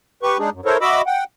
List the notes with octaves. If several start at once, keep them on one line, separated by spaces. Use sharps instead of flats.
G4 B4 C#6
G#3 D4 D#4 G#4
F#2
E4 A4 A#4 C5 C#5
F#4 D#5 E5 B5 D6 E6
F#5 G5